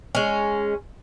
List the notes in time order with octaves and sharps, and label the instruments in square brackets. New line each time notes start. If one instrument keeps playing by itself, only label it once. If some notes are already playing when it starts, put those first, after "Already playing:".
[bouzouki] G#3 C#4